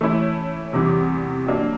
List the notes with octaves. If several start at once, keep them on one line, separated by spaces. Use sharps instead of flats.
E3 A3 C#4 E4
E2 C3 E3 G3
F#3 A#3 D4